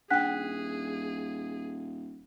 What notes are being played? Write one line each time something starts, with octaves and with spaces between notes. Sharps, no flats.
D#1 D4 G#4 F#5 G5 F#6 B6